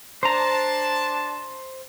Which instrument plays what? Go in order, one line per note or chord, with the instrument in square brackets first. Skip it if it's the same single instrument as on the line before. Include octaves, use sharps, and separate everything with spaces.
[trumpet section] D4 A5 [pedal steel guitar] C5 A#5